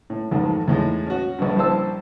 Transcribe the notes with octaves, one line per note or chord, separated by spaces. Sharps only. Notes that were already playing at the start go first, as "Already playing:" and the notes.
A2
A1 F2 G#2 D#3
E2 A2 G#3 D#4
C#4 F#4
A#1 G2
A#1 G3 E4 C5 A5 E6